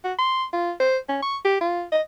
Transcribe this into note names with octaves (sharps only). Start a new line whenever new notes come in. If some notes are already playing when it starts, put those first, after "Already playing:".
F#4
C6
F4
C5
C#4
C#6
G4
F4
D#5